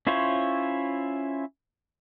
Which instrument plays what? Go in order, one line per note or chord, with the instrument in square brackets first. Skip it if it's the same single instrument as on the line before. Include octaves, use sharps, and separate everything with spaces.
[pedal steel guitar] C#4 E4 F4 C5 C#5